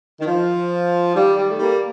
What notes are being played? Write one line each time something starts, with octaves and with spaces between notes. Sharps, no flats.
D#3
F3
D#3 G3
G3
A3
G3 A#3